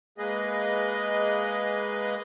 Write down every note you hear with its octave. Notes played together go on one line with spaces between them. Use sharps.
G#3 A#3 G#4 B4 D#5